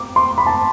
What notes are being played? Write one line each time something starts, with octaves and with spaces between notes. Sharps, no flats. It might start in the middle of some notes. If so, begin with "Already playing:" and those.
Already playing: D6
C6
B5
A5